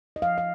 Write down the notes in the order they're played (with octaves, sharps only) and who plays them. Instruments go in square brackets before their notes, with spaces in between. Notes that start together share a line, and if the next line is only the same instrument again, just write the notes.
[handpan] D#5
F3 F5
F5